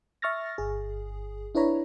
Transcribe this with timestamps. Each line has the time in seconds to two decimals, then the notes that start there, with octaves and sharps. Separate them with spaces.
0.22 E5 C#6 F6 A6 A#6
0.58 G1 G#4
1.55 D4 E4 B4 C#5 A#5 B5